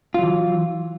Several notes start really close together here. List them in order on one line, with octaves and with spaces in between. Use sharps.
F4 F#3 E3